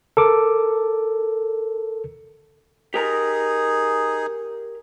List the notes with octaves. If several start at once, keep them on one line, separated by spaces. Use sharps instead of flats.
A4 A#4 D6
D#4 G4 G#4 A#4 A#5